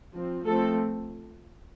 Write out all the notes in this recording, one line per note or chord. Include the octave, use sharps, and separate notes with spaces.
F3 C4
F3 A3 C4 A4